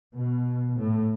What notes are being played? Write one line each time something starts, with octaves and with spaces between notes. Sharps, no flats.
B2
A2